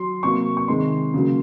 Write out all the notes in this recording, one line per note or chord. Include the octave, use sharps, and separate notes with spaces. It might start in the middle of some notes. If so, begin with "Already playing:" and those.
Already playing: F#3 C6
C3 F#3 A#3 C#6
C#6
C3 D#3 G#3 C6
C#3 F#3 A#3